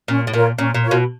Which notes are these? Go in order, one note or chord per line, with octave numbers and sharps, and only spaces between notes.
A#2 C#4
A2
A#2 F4 A#4 C#5
A#2 C#4
A#2
F4 A#4 C#5
B2